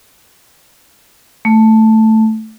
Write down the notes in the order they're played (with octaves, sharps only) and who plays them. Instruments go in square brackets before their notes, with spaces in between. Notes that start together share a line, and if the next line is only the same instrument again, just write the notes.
[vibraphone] A3